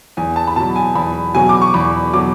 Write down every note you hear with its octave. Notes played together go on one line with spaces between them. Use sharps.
E2 G#5
A5
B5
B2 F#3 A5
G#5
E2 B5
B2 F#3 G#5
D6
C#6
E2 B5
B2 F#3 D6